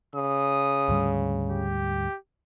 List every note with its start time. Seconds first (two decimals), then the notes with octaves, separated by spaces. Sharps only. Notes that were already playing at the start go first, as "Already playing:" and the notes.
0.15 C#3 D#6
0.89 D2 G#2 G3
1.51 G4